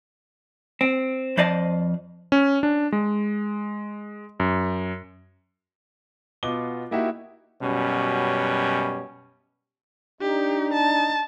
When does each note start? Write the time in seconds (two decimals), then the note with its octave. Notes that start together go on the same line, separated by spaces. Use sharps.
0.81 C4
1.37 F2 C5 D5 D#5 A5
2.32 C#4
2.63 D4
2.92 G#3
4.40 F#2
6.43 B2 B3 F4 D#5 D6 G7
6.91 A#3 D#4 E4 F#4 G4 E5
7.62 F#2 B2 G3 C#4
10.21 D4 D#4 G4
10.74 A5